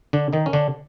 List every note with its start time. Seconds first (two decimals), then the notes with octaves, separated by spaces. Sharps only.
0.13 D3 D4
0.33 D#3 D#4
0.46 C#4
0.53 D3 D4